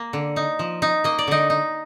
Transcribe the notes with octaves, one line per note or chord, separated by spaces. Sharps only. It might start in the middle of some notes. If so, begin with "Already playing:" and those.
Already playing: A#3
D3
D#4
F3
D#4
A#3 D#5
D5
D3 D#4 D#5
D#4